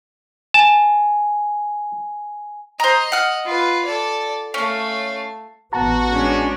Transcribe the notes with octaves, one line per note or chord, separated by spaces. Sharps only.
G#5 A5
C5 D#5 A#5
F#5 F6
F4 B4
A4 D5
A3 C#4 F5
A1 B3 F#4 A5 A#5
G#3 C#4 D4